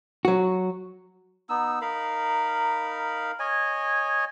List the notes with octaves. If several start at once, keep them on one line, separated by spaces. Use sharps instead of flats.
F#3 F#4
B3 D#4 E6
D#4 A#4 F5 B5
C#5 D#5 G#5